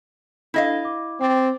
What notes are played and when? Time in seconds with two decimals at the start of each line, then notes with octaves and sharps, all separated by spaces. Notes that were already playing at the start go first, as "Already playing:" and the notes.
0.54 D4 E4 A4 D#5 F5
0.85 D6
1.21 C4 G5 D6 A6